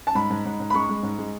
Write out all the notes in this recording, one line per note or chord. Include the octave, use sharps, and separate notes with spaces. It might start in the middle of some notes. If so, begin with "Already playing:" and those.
A5
G#2 B5
G#2
G#2
G#2
B5
G#3 C#6
G#3
G#2
G#3